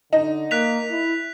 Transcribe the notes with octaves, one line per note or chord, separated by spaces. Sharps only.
D3 D#4
A#3 F#6 B6 F7
E4